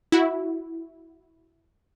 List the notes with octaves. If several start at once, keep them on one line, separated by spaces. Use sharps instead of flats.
E4 F#4